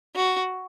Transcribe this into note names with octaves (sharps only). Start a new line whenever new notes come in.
F#4